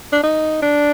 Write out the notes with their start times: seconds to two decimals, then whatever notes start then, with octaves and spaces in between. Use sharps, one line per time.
0.13 D4
0.23 D#4
0.63 D4